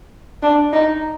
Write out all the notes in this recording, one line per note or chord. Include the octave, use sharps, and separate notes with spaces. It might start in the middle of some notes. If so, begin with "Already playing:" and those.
D4
D#4